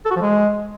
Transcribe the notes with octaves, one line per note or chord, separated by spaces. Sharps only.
A4
F#4
F3
G#3